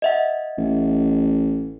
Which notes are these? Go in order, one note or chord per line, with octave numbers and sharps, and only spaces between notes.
D#5 E5 F#5
A1